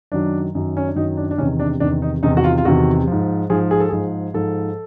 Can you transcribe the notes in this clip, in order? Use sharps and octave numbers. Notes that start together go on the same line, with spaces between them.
F#2 D#3 F#3 D4
F#2 D#3 F#3
C#4
D4
F#2 D#3 F#3 D#4
D4
D4
E2 C3 D#3 C#4
D4
E2 C3 D#3 D4
D#4
E2 C3 D#3 D#4
F#4
F4
F4
E2 C3 D#3 F#4
G#2 F3
G#2 F3 G#4
G#4
A4
G#2 F3 G#4
G#2 F3 A4